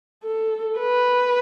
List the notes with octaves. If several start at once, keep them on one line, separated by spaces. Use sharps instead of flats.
A4
B4